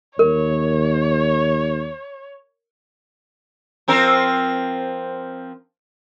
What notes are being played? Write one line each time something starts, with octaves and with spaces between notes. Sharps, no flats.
D#2 A#4 C#5
F3 C4 A#4